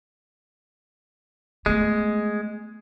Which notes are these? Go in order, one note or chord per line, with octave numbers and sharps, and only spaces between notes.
G#3 A3 B3